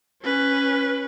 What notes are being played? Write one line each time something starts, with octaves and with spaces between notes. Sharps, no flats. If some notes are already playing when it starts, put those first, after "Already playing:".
C#4 B4